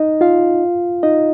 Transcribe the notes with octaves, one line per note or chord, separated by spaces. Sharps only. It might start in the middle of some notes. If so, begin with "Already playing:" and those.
Already playing: D#4 D#5
F4 F5
D#4 D#5